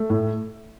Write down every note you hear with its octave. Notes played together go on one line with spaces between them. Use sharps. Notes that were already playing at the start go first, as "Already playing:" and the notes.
Already playing: A3
A2